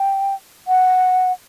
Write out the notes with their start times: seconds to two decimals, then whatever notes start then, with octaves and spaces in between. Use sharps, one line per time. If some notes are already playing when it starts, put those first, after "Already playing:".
Already playing: G5
0.68 F#5